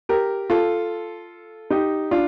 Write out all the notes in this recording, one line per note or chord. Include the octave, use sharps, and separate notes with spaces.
G4 A#4
F4 A4
D#4 G4
D4 F4